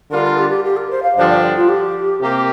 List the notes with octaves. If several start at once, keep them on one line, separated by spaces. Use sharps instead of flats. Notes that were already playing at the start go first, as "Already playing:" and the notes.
D3 G3 D4 F4 A#4
A#4
G4
G4
G4
A#4
C5
F5
G2 D3 F3 D4 G4 C5
D5
F4
G4
C3 A#3 G4 A#4